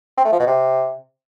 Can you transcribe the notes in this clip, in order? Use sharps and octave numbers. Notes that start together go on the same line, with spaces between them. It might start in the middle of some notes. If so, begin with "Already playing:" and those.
C4
A3
F3
B2
C3